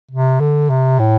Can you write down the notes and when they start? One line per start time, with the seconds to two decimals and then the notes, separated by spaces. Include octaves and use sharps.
0.11 C3
0.40 D3
0.70 C3
0.99 A2